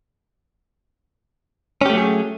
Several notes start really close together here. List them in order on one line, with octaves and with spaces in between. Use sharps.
C#4 G4 A3 F#3 G#4